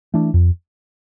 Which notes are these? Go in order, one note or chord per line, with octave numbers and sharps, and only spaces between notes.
E3 A3 D4
F2